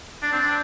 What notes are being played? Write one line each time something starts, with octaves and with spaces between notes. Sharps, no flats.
D4
C4
D4